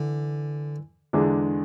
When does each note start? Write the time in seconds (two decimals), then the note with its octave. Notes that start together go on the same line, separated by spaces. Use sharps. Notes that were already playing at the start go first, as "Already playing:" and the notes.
Already playing: D3 E3
1.13 E2 D3 G#3 D4